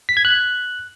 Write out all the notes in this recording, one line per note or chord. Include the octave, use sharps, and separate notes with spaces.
B6
G#6
F#6